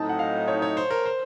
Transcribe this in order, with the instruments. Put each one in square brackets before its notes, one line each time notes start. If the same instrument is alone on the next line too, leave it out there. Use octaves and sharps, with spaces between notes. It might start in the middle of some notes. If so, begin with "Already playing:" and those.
Already playing: [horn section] A2 F#3 C4 D#4 [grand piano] A5
[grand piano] F#5
F5
C#5
C#5
C5
A#4
C5